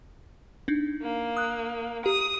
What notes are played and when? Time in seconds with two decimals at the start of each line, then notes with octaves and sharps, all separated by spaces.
0.68 D4 D#4
1.03 A#3
1.37 D#6 F#6
2.06 G4 D#6